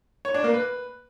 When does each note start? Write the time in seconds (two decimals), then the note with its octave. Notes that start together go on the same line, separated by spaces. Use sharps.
0.25 C#5
0.34 D4
0.44 A#3
0.54 B4